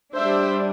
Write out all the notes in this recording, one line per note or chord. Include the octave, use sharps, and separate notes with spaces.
G3 D4 C5 E5